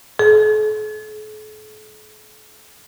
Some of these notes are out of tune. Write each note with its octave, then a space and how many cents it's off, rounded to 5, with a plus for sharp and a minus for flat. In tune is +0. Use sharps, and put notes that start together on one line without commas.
A4 -45